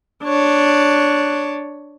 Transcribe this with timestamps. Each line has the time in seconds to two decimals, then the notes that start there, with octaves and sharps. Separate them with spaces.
0.25 D4 C#5